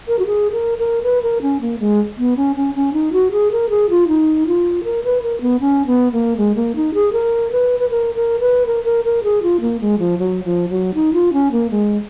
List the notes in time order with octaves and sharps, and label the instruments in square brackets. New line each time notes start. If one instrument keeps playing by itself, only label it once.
[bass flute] A#4
F#4
G#4
A#4
A#4
B4
A#4
C#4
A#3
G#3
B3
C#4
C#4
C#4
D#4
F#4
G#4
A#4
G#4
F4
D#4
F4
A#4
B4
A#4
B3
C#4
B3
A#3
G#3
A#3
D#4
G#4
A#4
B4
B4
A#4
A#4
B4
A#4
A#4
A#4
G#4
F4
A#3
G#3
F3
F#3
F3
F#3
D#4
F4
C#4
A#3
G#3